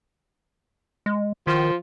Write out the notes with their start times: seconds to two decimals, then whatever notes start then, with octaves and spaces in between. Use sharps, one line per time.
1.06 G#3
1.47 D#3 F3